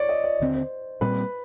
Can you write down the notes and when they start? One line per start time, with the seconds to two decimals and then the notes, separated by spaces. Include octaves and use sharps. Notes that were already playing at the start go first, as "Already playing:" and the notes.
Already playing: C#5 D5
0.09 D#5
0.24 D5
0.40 D#2 D3 G3 C4
0.55 C5
1.01 A#2 G3 C4 B4